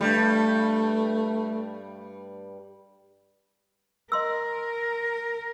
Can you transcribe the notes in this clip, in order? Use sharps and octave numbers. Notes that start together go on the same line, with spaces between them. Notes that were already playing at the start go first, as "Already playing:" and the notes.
G2 G3 A3
A#4 D#5 C6 E6